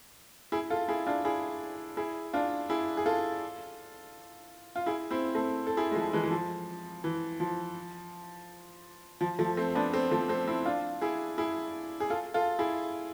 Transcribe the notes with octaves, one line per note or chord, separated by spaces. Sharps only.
E4 G#4
F4 A4
E4 G#4
D4 F4
E4 G#4
E4 G#4
D4 F4
E4 G#4
G#4
F4 A4
F4
E4 G#4
C4 E4
A3 C4
A4
E4 G#4
G#3
F3 A3
E3 G#3
E3
F3
E3
F3
F3
F3 A3
A3 C4
B3 D4
A3 C4
F3 A3
A3 C4
C4 E4
D4 F4
E4 G#4
E4 G#4
G#4
F4 A4
F4 A4
E4 G#4